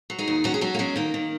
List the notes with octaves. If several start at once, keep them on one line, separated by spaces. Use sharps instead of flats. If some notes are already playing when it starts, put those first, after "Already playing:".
F#3
D#4 G#4
D#2
F#3 C#4 F#4
G#4
F#3 C#4 F#4
A#3
F#3 G#3 C#4
D#3 A#3
D#3